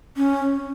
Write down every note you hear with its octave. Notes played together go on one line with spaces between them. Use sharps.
C#4